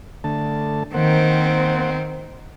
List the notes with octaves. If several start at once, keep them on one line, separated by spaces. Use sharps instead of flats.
D3 A3 A5
D#3 A#3 C4 C5 F#5